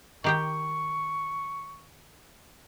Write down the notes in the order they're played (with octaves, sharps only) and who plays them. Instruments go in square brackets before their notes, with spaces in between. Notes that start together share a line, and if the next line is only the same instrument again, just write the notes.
[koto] D#3 G4 G5 [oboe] C#6